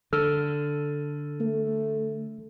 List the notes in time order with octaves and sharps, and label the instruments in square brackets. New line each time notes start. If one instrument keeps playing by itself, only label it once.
[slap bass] D3 [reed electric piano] A4 E6 F6
[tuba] A3